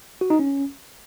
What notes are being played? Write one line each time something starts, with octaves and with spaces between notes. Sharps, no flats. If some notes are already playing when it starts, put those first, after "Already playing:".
F#4
D#4
C#4